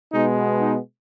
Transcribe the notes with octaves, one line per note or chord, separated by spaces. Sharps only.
B2 G#3 B3 D#4
D#4